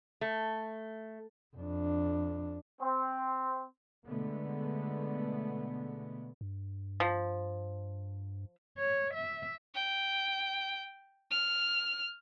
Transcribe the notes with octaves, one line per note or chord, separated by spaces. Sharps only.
A3
F2 D4
C4
B2 D3 G#3 A3 B3
G2
F3
C#5
E5
G5
F6